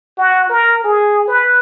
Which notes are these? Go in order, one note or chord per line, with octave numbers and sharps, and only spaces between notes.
F#4
A#4
G#4
B4